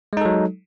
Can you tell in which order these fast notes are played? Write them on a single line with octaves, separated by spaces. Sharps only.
G#3 D#4 A4 F#3